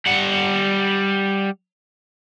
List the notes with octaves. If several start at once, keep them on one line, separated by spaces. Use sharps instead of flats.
G3 F#5